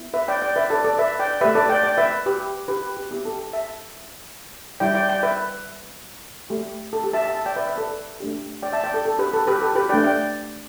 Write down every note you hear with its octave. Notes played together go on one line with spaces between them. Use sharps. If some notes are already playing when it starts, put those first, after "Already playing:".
Already playing: B3 E4
B4 E5
D5 G5
D5 G5
B4 E5
A4 D5
A4 D5
B4 E5
D5 G5
A3 G4 B4 E5
A4 D5
D5 G5
D5 G5
B4 E5
G4 B4
G4 B4
G4
B3 E4 G4
A4
A4
E5 A5
G3 E4 G4 D5 G5
D5 G5
D5 G5
B4 E5
A3 G4
A4
G4
E5 A5
E5 A5
E5 A5
D5 G5
B4 E5
B4 E5
A4 D5
A3 D4 G4
D5 G5
E5 A5
D5 G5
A4
A4
G4 B4
A4
G4 B4
A4
G4 B4
A3 D4 G4 D5 G5
D5 G5